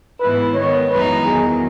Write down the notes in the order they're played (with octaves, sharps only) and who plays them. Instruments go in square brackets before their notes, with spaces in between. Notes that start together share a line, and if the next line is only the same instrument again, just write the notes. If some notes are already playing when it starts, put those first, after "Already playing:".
[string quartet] G#2 E3 B3 E4 [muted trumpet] B4
[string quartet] D#3 G#3 B3 [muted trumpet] C#5
[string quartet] F#2 E3 G#3 B3 D#4 [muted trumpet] B4
[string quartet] E2 D#3 F#3 [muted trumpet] G#4